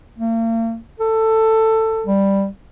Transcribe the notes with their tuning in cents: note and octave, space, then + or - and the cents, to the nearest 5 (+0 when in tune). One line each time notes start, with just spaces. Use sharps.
A#3 -40
A4 +15
G3 +5